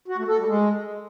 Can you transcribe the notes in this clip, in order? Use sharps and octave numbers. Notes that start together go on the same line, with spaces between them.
F#4
A3
A4
G3
G#3